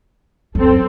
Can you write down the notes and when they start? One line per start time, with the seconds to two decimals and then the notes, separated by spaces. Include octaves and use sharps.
0.55 F#2 C4 A4